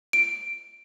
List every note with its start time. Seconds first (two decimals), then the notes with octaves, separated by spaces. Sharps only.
0.13 D7